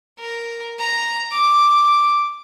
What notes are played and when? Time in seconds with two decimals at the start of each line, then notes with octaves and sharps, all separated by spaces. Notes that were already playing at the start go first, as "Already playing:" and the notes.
0.19 A#4
0.79 A#5
1.31 D6